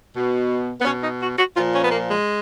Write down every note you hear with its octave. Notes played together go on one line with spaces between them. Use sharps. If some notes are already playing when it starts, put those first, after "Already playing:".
B2
B3
B2 C#4
D#4
F#4
F#4
A#2 F3 F4
C#4
B3
A#3
G#3